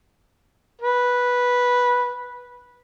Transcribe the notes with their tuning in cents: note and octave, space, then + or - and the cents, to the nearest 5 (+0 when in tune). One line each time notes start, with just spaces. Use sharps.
B4 -10